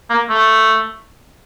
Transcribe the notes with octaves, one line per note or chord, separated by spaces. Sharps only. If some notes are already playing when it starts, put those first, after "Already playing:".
A#3
A3